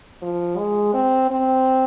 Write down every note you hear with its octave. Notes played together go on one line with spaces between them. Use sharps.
F3
G#3
C4
C4